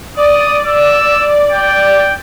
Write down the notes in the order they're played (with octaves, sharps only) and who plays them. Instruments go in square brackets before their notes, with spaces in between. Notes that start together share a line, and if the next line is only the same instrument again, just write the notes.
[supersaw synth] D5 [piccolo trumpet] D#6
[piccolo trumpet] E6
G5